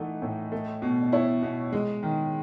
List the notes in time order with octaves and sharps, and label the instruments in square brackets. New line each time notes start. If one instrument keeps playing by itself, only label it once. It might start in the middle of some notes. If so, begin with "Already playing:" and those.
Already playing: [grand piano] E3 A3 D#4 [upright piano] D#5 F#5
[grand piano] A2
A3
B2
[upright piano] D#5
[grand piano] E4 [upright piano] C#5
[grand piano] B2
[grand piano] G#3 [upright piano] D#5
[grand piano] D#3